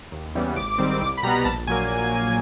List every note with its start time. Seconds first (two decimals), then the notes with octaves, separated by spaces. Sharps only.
0.12 D#2
0.35 C#3 E3 G3 B3
0.56 G#1 D6
0.78 G#2 D#3 G3 C4
1.01 C2 D6
1.18 B5
1.23 B2 G3 B3 A#5
1.45 A#1 A5
1.67 A#2 F#3 A#3 G#5